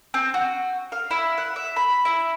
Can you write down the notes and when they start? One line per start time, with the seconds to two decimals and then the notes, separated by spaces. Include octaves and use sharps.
0.14 C4
0.34 F#4
0.92 F5
1.11 E4
1.38 F#5
1.56 E5
1.76 B5
2.05 E4